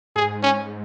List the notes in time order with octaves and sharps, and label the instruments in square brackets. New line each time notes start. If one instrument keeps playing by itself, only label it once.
[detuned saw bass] G#2 [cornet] G#4
[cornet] C#4